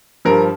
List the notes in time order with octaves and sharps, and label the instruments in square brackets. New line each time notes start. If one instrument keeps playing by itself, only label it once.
[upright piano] G2 F3 A#4